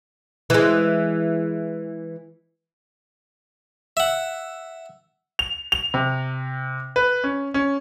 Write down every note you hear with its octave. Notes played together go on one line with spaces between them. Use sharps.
E3 G#3
E5 F#5
F7
F7
C3
B4
C#4
C#4